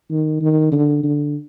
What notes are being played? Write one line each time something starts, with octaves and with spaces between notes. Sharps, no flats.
D#3
D#3
D3
D3